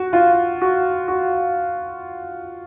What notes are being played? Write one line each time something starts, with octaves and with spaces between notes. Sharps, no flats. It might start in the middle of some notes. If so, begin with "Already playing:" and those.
Already playing: F#4
F4
F#4
F#4